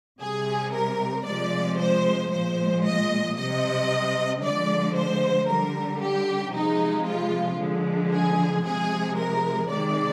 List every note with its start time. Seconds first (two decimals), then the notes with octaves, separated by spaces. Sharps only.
0.20 C3 G3 G#4
0.73 A#4
1.25 C3 F3 G#3 D5
1.79 C5
2.32 A#2 F3 G#3 C5
2.84 D#5
3.36 C3 G3 D#5
4.42 D3 F3 G#3 D5
4.95 C5
5.48 D3 G3 A#4
6.01 G4
6.53 C3 F3 G#3 D#4
7.06 F4
7.59 D3 F3 G#3
8.12 G#4
8.64 C3 F3 G#3 G#4
9.17 A#4
9.70 C3 D#3 G#3 D5